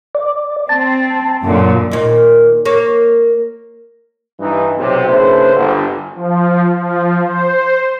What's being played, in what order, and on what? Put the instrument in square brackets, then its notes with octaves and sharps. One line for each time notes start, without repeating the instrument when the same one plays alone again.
[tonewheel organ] D5
[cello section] C4 [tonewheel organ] A5
[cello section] F#2 A#2 D3
[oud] D#2 A#2
A#3 C#5
[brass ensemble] G2 E3 D#4
B1 C3
C#3 A#3 D4 E4 B4 C5
G1
[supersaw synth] F3
F3
C5